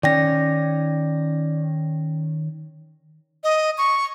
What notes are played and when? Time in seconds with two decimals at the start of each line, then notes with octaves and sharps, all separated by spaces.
0.03 D#3 C#4 D5 G5 A#6
3.44 D#5
3.78 C#6